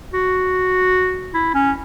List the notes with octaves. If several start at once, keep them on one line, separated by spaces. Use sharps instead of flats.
F#4
E4
C#4